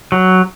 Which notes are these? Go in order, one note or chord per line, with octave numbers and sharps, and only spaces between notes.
F#3